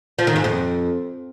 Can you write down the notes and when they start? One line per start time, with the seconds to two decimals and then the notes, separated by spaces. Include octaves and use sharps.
0.19 F3
0.27 D#3
0.36 G#2
0.44 F2